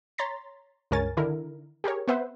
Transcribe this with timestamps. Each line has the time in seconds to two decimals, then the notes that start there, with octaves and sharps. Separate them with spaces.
0.18 C#5 A#5 C6 A6 B6
0.91 C#2 G2 A#4 C#5 G#5 A6
1.17 D3 D#3 E4 A#4
1.84 G4 G#4 A#4 C#5
2.07 B3 C4 B4 C5 E5 F#5